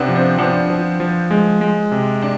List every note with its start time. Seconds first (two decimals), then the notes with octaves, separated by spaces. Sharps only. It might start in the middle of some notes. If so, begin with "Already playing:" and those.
Already playing: C3 B3 C4 D4
0.08 F3
0.16 C4
0.38 F3 B3 D4
0.70 F3
1.00 F3
1.31 G#3
1.61 G#3
1.92 C3
2.22 D4